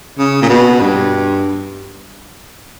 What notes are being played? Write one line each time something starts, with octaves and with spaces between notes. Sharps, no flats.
C#3
A#2
B2
G2